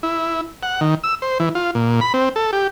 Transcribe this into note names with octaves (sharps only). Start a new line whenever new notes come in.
E4
F#5
D#3
E6
C5
E3
F4
A#2
B5
C4
A4
G4